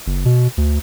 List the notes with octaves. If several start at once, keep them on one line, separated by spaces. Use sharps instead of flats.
F#1
B2
D2